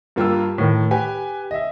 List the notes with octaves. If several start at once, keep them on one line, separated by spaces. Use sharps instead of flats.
G2 A#3 F4 G4 A#4 E6
A2 D#3
G4 B4 G#5
D#5 E5